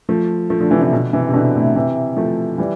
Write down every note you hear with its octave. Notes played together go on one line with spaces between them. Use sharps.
F3 A3
F3 A3
D3 F3
C3 E3
C3 E3
B2 D3
C3 E3
C3
B2 D3
A2 C3
C3 E3
F3 A3
E3 G3